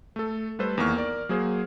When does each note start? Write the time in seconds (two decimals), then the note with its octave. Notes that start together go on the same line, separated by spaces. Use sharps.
0.16 A3 A4
0.59 G3 A3 A4 B4 C5
0.78 E2 D#3 A#3 C#6 F6
0.97 A#4 D5
1.29 F#3 A#3 G#4 C5